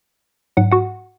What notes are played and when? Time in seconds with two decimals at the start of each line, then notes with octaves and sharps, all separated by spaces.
0.57 G#2 F#3 F#5
0.71 F#4 F#5